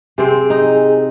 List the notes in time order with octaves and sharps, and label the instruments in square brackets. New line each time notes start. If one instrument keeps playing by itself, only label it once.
[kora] C3 C4 [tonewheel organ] G#4
[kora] D#4